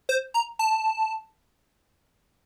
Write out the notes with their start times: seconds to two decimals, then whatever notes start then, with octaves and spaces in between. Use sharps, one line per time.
0.09 C5
0.34 A#5
0.59 A5